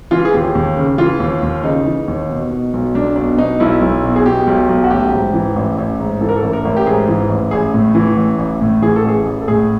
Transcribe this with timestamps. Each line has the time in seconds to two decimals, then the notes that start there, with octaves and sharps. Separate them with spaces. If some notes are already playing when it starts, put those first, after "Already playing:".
0.11 E3 F4
0.25 G#4
0.34 D#2 G4
0.55 D#2
0.77 C#3
0.98 E3 F4
1.20 D#2
1.43 D#2
1.64 C#3 D#4
1.86 E3
2.08 D#2
2.29 B2
2.51 B2
2.73 B1
2.95 B1 D4
3.16 B2 D4
3.38 B2 D#4
3.60 B1 E4
3.82 B1
4.03 B2
4.16 G#4
4.25 B2 G4
4.47 B1
4.69 B1
4.84 F#4
4.90 A1 G4
5.13 G#2
5.34 E3
5.56 A1
5.78 A1
6.00 G#2
6.21 E3 A4
6.29 A#4
6.36 A4
6.42 A1
6.53 A#4
6.65 A1
6.77 G4
6.86 G#2 G#4
7.09 E3
7.30 A1
7.51 A1 G#4
7.74 A2
7.95 E3
8.17 A1
8.38 A1
8.61 A2
8.82 E3 G#4
8.96 A4
9.04 A1 G#4
9.26 A1
9.41 A4
9.48 A2 G#4